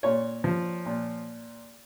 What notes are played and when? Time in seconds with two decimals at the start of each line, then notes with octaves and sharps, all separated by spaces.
0.03 A#2 C#5
0.44 F3
0.86 A#2